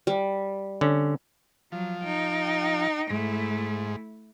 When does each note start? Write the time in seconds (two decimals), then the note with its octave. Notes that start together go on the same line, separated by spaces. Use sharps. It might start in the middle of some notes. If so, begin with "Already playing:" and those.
0.07 G3
0.81 D3 C#4
1.72 F3 F#3
2.04 D#4 G5
3.10 G#2 A3 E4